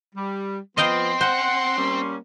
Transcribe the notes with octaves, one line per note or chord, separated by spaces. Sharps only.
G3
F3 B3 C4 D#5 F5 G5 C6
C5 F#5
G3 A#3 C#4